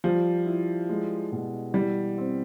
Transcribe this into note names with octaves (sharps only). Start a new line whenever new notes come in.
F3 G3
E4
G#3
B2
E3 G3
C4